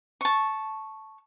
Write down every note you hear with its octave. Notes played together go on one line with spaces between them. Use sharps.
A5 C#6